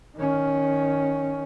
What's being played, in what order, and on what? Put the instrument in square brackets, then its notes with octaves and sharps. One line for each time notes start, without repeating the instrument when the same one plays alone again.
[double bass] D#3 C#4